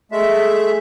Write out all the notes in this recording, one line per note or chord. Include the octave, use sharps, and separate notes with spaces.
G#3 A3 E5